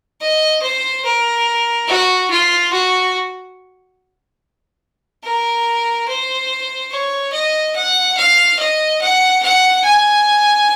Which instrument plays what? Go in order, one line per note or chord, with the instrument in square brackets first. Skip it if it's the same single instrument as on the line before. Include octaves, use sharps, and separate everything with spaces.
[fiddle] D#5
C5
A#4
F#4
F4
F#4
A#4
C5
C#5
D#5
F#5
F5
D#5
F#5
F#5
G#5